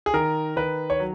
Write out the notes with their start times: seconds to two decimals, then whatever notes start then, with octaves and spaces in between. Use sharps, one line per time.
0.06 G#4
0.14 D#3 A#4
0.56 D#3 B4
0.90 C#5
1.00 F#3